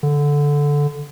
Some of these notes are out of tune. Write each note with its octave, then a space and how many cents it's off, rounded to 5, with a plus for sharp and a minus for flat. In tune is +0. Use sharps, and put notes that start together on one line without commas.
D3 -10